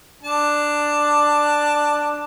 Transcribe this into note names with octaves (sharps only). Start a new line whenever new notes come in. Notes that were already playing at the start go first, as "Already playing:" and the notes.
D4 A5